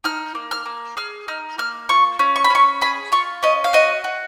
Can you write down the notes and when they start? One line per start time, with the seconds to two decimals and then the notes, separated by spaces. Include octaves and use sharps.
0.04 D#4 F6
0.35 A#3
0.51 F6
0.66 A#3
0.97 G#4 F6
1.28 D#4 F6
1.58 A#3 F6
1.89 F4 C#6
2.19 C#4
2.36 C#6
2.44 B5
2.50 C#4 C#6
2.81 G#4 B5
3.12 F4 C#6
3.43 C#4 D#5
3.64 F5
3.73 F#4 D#5
4.04 F#4